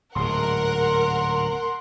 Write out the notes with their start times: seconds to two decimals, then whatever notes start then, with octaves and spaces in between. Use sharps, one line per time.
0.15 D1 G#2 A#4 F#5 C6